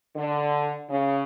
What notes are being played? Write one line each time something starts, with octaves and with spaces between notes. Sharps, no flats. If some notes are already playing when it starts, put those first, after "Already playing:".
D3
C#3